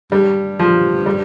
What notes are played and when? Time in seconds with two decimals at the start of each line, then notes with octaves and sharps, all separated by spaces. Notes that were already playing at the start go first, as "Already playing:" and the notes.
0.11 G2 G3
0.59 F3
1.06 G3